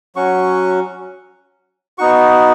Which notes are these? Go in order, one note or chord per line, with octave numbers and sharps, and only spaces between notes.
F#3 C#4 F#4 C#6
B3 D#4 F#4 C#6